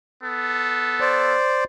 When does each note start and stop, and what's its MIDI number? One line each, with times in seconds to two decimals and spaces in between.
0.23 1.34 59
0.23 1.34 69
1.00 1.64 72
1.00 1.64 74